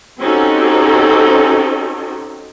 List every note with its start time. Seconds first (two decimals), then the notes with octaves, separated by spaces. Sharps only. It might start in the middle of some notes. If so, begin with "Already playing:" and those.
0.19 C4 C#4 D#4 F#4 G4 A4